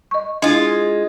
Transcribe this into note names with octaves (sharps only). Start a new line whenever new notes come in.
D#5 C#6
G#3 D4 E4 F4